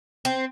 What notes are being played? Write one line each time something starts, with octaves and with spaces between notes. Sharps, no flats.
C4